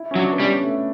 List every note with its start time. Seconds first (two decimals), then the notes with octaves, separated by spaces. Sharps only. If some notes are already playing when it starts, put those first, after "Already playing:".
Already playing: E4
0.11 C#4
0.15 F#3 D4
0.33 B3
0.39 G3 C#4
0.63 A3